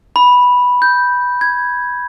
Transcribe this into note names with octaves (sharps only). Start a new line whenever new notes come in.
B5
G6
G#6